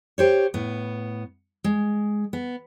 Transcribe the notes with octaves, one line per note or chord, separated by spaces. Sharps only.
G4 C5 C#5
A2 B3
G#3
B3